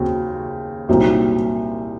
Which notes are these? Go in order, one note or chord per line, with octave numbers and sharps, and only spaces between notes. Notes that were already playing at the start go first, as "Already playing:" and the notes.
Already playing: D#2 C#3 F#3 C4
C2 A#2 F#3 C4 D#4